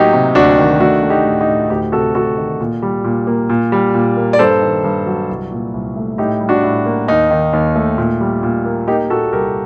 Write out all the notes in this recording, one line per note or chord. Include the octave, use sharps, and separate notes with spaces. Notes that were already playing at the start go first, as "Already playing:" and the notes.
Already playing: A2 F#3 A#3 D#4 G4
C3
D2 D4 F#4
D#3
A3 D4 F#4
A3
D#4 G4
A2
D#4 G4
A2
D2 D#4 G4
C3 F#4 A4
D2 F#4 A4
D#3
A#2
G3
A#2
A#3
A#2
G3
A#2
A#3
D5
G2 A4 C5
D#3
G2
F#3
C2
A#2
C2
A3
A2 D#4 G4
G3
D4 F#4
A2
A#3
D#2 D#4
D#3
D#2
A3
A#2
G3
A#2
A#3
A#3 D#4 G4
A#2 F#4 A4
C2 G4 A#4